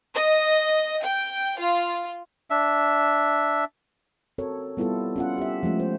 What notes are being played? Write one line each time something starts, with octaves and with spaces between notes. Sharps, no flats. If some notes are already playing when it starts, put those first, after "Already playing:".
D#5
G5
F4
D4 E5
C4 F#4 A4 A#4 C#5
G3 B3 E4 F4 A4
C#4 F4 F#5
G4 E5
F3 G#3 A3 C#4
C5